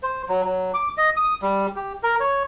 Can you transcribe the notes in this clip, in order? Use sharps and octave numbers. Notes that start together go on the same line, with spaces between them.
C5
F#3
F#3
D6
D#5
D#6
G3
G4
A#4
C#5